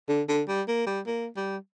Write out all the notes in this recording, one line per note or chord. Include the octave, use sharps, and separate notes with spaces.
D3
D3
G3
A#3
G3
A#3
G3